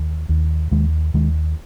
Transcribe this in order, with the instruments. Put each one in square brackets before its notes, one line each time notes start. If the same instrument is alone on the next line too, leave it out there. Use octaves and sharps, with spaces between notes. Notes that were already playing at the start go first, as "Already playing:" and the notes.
Already playing: [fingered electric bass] D#2
D#2
D#2 D#3 G#3
D#2 D#3 G#3